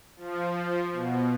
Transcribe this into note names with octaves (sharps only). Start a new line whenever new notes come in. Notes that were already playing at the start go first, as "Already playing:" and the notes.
F3
B2